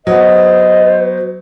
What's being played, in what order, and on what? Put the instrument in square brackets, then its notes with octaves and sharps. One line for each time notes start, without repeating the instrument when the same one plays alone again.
[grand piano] F#3 B3 [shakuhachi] C5 [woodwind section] D#5